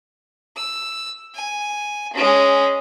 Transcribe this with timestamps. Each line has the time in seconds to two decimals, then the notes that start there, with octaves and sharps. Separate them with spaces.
0.56 E6
1.34 G#5
2.13 G#3 C#4